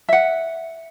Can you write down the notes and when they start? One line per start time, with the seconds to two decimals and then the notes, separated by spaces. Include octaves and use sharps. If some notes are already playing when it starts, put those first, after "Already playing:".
0.09 E5 F#5